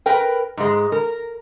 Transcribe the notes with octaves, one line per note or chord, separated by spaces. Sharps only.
A#4 B4 G5
G#2 G#3
A#4